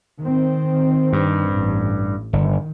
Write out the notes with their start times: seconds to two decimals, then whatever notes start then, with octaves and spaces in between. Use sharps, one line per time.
0.21 D#3 C4
1.13 G2
1.53 A1
2.33 G1 D#3